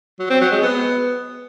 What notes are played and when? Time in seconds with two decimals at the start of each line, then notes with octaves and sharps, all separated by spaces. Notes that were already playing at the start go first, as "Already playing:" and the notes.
0.19 F#3
0.30 C4
0.41 F#3
0.52 G#3
0.62 B3